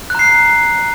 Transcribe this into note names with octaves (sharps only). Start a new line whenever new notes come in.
A#5 F#6 C7